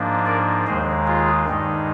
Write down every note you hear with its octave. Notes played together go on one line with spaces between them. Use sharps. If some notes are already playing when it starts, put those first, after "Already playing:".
Already playing: G#2 F3 A#3 D4
A#4 D5
D#2 D#3 G#3 G#4 C5
F4 G#4
G2 D#3 G#3 D#4